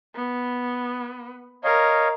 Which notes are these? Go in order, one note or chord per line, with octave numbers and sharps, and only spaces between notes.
B3
A#4 C#5 D#5 F5